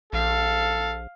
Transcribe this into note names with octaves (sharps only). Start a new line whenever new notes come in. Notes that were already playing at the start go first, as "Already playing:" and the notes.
A#1 A4 F5